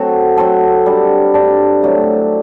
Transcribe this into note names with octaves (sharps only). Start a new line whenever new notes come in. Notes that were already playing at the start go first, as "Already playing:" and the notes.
Already playing: F#3 C4 F#4 A4
F#3 C4 F#4 A4
G3 D4 A4
G3 D4 A4
A2 F#3 C4